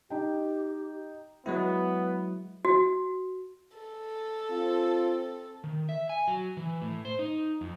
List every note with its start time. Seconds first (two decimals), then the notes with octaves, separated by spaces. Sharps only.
0.10 D#4 G4 G5
1.46 F#3 G#3 B3 E4
2.65 F#4
3.78 A4
4.51 C4 F4
5.64 D#3
5.89 E5
6.09 G#5
6.28 F#3
6.57 E3
6.82 A2
7.05 C5
7.19 D#4
7.61 F2